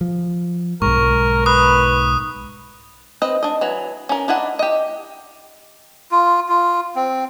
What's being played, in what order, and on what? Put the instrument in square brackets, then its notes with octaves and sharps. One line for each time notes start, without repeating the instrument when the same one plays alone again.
[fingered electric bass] F3
[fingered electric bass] B1 G#2 [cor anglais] A#4 [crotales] C#6
[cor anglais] B4 [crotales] D#6 F#6
[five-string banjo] C4 B4 D#5
D4 D#5
E3 F#3
C#4 A#4
D4 E4 D#5 F#5
G4 D#5
[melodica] F4
F4
C4